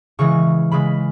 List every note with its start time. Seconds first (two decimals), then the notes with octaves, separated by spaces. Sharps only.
0.19 C#3 E3 G#3 C#6
0.72 C#3 G#3 B5